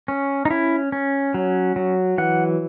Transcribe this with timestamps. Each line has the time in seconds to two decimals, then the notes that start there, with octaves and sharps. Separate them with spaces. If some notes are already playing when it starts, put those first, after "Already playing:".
0.08 C#4
0.45 D#4
0.50 C#4 E4
0.92 C#4
1.34 F#3
1.76 F#3
2.18 E3 F#5